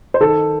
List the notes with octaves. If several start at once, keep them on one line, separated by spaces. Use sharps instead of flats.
C5
D#3 A4